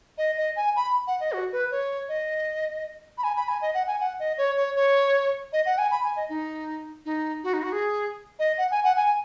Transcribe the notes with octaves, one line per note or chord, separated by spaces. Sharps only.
D#5
D#5
G#5
B5
F#5
D#5
F#4
B4
C#5
D#5
B5
G#5
B5
G#5
D#5
F#5
G#5
F#5
D#5
C#5
C#5
C#5
D#5
F#5
G#5
B5
G#5
D#5
D#4
D#4
F#4
D#4
F#4
G#4
D#5
F#5
G#5
F#5
G#5